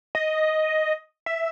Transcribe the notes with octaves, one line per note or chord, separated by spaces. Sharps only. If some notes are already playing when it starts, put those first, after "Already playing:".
D#5
E5